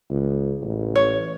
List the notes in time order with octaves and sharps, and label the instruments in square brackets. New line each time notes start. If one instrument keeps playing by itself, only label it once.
[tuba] C#2
A1
[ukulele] C#5